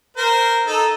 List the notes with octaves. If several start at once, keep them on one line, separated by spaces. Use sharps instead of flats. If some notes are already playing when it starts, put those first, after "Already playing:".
A#4 C5
D#4 A4